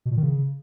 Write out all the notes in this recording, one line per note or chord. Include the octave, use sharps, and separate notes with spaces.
B2
A#2
D#3
C#3